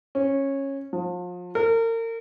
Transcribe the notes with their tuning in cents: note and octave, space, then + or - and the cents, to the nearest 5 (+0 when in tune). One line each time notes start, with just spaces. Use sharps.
C#4 -15
F3 +35
A#4 -35